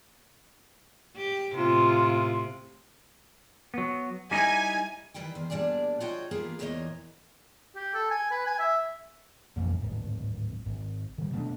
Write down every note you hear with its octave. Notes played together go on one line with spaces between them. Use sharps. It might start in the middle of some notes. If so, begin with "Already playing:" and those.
G4
A2 C3 F4
F#3 B3
G3 D#4 E4 G#5
D#3 E3 G3 B4 G5
E2 D#3 C5
A#2 G3 D4 G#4 D5
F4 F#4 C#5 D#5 F#5 G5
A#3 B3 F4 G4 G#4
E2 A#2 E3 A#3 C#5 D#5
G4
A4
G#5
B4
G#5
E5
E1 A1 F2 A#3
D1 G#1
G#1
D#3 G3
B2 A3 D4